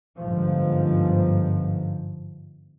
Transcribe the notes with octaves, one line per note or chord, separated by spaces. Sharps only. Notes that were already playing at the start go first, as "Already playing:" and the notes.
G1 G#2 F3